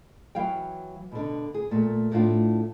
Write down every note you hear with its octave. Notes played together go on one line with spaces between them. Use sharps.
E3 F#3 F5 G5
B2 D3
G#4
A#2 A3
A2 A3 B3 D4 F4